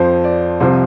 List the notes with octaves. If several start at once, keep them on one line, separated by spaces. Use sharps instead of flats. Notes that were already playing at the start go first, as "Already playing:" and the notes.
Already playing: F2 F3 C5
D5
C2 C3 F3 C5